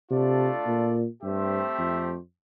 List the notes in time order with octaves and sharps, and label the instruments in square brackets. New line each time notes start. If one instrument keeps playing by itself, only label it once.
[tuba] C3 [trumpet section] A3 D4 F4 A4 D5
[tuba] A#2
[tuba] G2 [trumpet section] A3 C4 G4 C5 E5
[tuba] F2